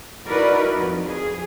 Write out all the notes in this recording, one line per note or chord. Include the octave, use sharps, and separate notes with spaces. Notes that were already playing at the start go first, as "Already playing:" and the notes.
D#4 E4 F#4 A#4 B4 D5
F2
G#4